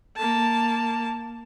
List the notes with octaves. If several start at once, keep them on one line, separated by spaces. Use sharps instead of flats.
A#3 A5